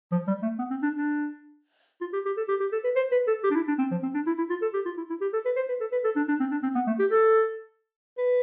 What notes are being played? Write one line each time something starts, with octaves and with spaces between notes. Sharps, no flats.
F3
G3
A3
B3
C4
D4
D4
F4
G4
G4
A4
G4
G4
A4
B4
C5
B4
A4
G4
D4
E4
D4
C4
F3
C4
D4
E4
E4
F4
A4
G4
F4
E4
E4
G4
A4
B4
C5
B4
A4
B4
A4
D4
D4
C4
D4
C4
B3
A3
G4
A4
B4